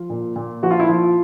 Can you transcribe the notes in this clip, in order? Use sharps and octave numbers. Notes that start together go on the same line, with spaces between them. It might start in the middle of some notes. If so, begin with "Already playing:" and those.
Already playing: F3 F4
A#2
A#2
F3 F#4
F4
E4
F3 F4